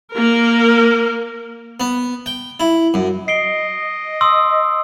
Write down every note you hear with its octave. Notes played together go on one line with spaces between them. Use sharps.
A#3 A#4
B3
G5
E4
F#2
D#5 C7 D7 G7
C6 D#6 E6